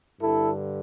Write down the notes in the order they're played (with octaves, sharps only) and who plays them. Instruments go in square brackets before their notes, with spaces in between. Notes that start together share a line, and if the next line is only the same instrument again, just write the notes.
[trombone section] G2 D3 E4 A4